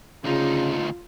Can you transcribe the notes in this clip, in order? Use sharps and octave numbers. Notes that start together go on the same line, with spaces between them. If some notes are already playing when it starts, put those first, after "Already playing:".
D2 C#3 D#4 F4